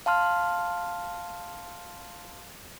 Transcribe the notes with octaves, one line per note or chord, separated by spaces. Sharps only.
F5 A5 C6 F6